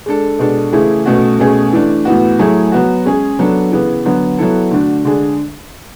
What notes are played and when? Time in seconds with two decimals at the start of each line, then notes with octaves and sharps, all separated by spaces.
0.06 G#3 D4 A4
0.39 B2 G#3 D4 A4
0.73 C#3 E3 A3 E4 G#4
1.06 B2 A3 C#4 F#4
1.39 B2 A3 C#4 G#4
1.73 E3 A3 D4
2.05 A2 E3 B3 F#4
2.39 F#3 A3 E4 G#4
2.72 F#3 B3 F#4
3.05 G#3 C#4 G#4
3.39 F#3 B3 D4 A4
3.72 C#3 E3 B3
4.05 D3 F#3 B3
4.38 F#3 B3 E4 A4
4.71 D3 A3 D4 F#4
5.05 D3 G#3 D4 G#4